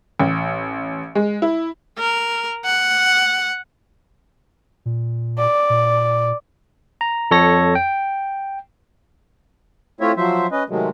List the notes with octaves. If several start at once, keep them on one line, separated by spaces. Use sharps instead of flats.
A1
G#3
E4
A#4
F#5
A#2
D5
A#2
A#5
F2 A4 C#5 A#6
G5
A3 C4 E4 F4 C#5 E5
F3 F#3 C5 E5
C#4 B4 D#5
C3 D#3 F#3 G#3 A3